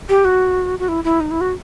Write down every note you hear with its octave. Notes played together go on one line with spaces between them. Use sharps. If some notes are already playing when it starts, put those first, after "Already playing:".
G4
F#4
F#4
E4
E4
D#4
E4
F#4